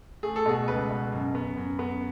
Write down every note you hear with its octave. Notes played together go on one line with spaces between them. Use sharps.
A3 G#4
A4
B2 G#4
C#2 B4
B2
F#2
B3
F#2
B3